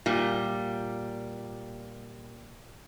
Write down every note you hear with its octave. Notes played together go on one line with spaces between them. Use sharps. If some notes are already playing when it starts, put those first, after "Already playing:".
A#2 G3